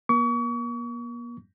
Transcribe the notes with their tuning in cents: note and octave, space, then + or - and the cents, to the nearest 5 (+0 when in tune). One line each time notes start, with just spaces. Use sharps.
A#3 +45 C#6 +35